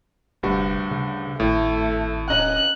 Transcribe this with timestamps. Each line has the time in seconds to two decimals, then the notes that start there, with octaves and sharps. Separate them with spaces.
0.43 F1 D2 G2 F#4
0.91 C#3
1.40 G#1 A2 A3
2.30 D1 C#4 D#5 A#5 F#6